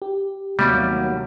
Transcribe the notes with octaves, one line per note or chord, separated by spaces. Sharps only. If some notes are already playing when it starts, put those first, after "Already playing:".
G4
D#2 C3 F#3 G3 A3 B3 C4